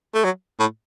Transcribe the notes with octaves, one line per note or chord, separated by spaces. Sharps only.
A3
F#3
A2